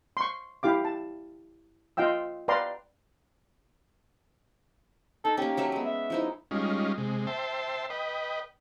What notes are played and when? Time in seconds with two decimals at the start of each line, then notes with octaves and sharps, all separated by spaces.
0.17 C6 C#6
0.63 E4 G4 F5 D6
0.85 A5
1.97 F4 D#5 F5 G5 E6
2.48 B4 D5 F5 G5 A#5 C6
5.25 D#4 A4
5.37 A#3 C#4 G4
5.57 F#3 A3 E5
5.72 G#3 B3
5.85 E5
6.10 F3 D#4 E4
6.51 G3 G#3 C#4 D#4 F4
6.98 C3 G#3
7.27 C5 E5 G5 A5
7.90 B4 D#5 G5